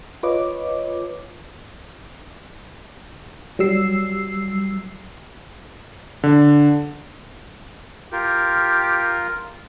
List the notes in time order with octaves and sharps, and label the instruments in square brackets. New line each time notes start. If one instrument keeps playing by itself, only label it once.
[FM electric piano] F4 B4 C#5 D#5 D6
F#3 G3 E6 C7
[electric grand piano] D3
[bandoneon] F4 A#4 [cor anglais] G4